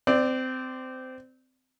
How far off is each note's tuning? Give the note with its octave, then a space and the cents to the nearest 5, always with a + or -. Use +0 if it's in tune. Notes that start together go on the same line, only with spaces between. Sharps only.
C4 -20 D5 +10